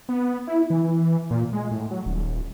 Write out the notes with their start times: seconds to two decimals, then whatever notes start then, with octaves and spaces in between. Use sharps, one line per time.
0.09 B3
0.47 E4
0.70 E3
1.31 A#2
1.53 G#3
1.71 A2
1.91 F#3
2.06 D#1